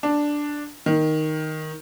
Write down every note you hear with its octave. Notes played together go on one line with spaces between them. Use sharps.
D4
D#3